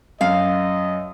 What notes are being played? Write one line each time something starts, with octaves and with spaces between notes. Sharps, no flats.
F#2 D#5 F5